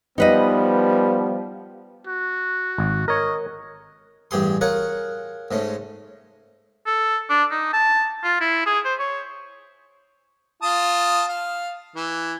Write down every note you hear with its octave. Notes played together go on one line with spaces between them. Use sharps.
F3 G3 B3 D#4 B4 D#5
F#4
G#1
A#4 C#5 D#5
A1 G2 G4 G#4 C6
F4 G#4 A#4 C#5 F#5
G#2 G#3 A3 C#4
A4
D4
D#4
A5
F4
E4
G#4
C5
C#5
F4 A5 D#6
F5
E3